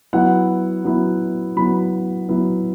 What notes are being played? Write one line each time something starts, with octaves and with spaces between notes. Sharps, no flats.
F#3 B3 E4 F#5
F#3 B3 E4
F#3 B3 E4 B5
F#3 B3 E4